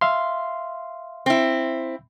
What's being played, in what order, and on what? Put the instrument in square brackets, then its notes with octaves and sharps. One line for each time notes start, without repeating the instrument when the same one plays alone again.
[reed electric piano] E5 F5 C6
[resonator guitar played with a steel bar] C4 E4